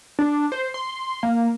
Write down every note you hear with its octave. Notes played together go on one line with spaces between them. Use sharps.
D4
C5
C6
A#3